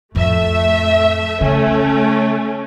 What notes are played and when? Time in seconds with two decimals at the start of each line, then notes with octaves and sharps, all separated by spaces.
0.15 F2 A2 A3 E5
1.41 C#3 A3 C#4